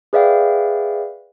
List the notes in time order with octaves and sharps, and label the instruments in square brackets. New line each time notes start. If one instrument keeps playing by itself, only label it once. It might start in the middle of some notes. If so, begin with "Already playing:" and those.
[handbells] G#4 B4 D5 E5 F5 G5